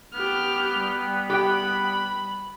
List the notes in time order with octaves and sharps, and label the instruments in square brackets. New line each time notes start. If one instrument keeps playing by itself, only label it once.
[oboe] B3 [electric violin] G4 F6
[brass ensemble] G3
[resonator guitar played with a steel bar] G4 G5 [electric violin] B5